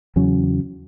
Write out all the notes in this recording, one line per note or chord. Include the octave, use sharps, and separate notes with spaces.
E2 C#3 F#3 C#4